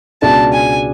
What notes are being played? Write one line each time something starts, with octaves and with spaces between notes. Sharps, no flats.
C#2 B2 G#3 D4 F#4 A5
G#5